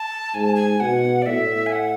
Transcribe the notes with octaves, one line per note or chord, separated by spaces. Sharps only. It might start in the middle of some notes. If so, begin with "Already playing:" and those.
Already playing: A5
G#2 G#5
A5
G#5
B2 F#5
D5
A2 E5
G#5
F#5